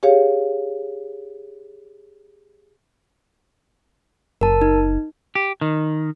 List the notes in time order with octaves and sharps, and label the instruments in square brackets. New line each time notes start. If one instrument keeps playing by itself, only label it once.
[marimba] G4 G#4 C#5 F5
[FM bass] F#1 [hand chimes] A#4 A5
[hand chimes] D#4
[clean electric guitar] G4
D#3